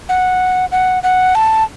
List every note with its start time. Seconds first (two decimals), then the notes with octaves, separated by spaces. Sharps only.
0.09 F#5
0.72 F#5
1.03 F#5
1.35 A5